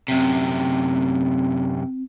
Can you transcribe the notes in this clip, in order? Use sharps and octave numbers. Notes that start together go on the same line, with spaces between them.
F#2 C3 C4